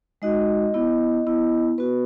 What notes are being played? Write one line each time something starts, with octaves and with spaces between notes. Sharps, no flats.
G#3 D#4 F#4 D#5
B3 E4
B3 E4
B3 F#4 B4